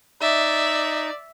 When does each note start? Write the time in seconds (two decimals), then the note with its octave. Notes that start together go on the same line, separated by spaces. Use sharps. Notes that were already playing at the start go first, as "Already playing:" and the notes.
0.21 D#4 D5 E5